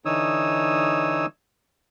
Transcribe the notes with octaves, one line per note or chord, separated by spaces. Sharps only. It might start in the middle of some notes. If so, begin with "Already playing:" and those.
D3 E3 D#4 C#5 D#6 E6